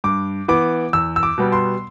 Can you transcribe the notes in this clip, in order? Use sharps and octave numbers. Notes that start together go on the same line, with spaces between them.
G2 D6
E3 B3 D6
E2 E6
E6
D6
B2 G3 B3
C6